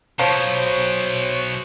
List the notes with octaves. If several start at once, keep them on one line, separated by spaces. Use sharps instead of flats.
B2 F3 F#3 C5 C#5